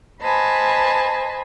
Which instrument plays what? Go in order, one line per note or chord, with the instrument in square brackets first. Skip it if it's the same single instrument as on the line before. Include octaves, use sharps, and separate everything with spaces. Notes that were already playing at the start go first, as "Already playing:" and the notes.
[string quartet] B4 C5 D#5 G#5 A5 B5